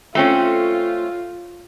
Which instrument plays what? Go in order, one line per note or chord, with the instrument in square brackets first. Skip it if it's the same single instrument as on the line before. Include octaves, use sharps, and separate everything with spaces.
[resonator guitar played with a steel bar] A3 C4 C#4 [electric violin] F4